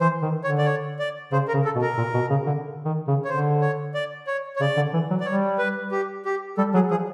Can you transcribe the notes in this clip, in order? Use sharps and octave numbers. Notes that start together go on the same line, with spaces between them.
E3 C5
D#3
D3 C#5
D5
C#5
D5
C#3 C5
A#4
C#3
A4
B2
A#4
A#2
B2
C#3
D3
D#3
C#3
C#5
D3 C5
C#5
D5
C#5
C#5
C#3 D5
D3
E3
F#3
D5
G3 C#5
B4
G4
G4
G3 A4
F#3 G#4
F3 G#4